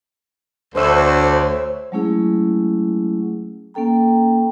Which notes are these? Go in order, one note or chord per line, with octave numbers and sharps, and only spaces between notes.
D2 C5 C#5 E5
F#3 G#3 A3 C#4 E4 G#4
A#3 C#4 A4 G5 A#5